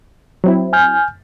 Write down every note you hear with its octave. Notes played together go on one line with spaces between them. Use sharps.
F#3 C4 E4
G#5 F6 G6